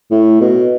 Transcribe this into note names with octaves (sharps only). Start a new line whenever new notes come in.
A2
B2